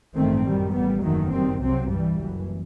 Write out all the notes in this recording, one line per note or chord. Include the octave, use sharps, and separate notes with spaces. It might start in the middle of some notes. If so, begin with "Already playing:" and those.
A1 G2 D#3 A3 C4
F#2 D#3 G3
A1 A2 G3 B3
F#1 E2 D#3 F#3 A3
F#2 D#3 G3 C4
C2 C3 F#3 C4
G2 E3 G3
F#1 F#2 E3